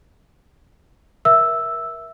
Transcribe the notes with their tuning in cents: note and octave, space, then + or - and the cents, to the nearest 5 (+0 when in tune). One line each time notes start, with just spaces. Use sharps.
A#4 +30 E5 +0 E6 +0